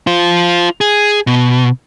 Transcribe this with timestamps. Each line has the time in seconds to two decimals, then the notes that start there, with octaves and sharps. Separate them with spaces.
0.07 F4 C5
0.81 G#4
1.27 B2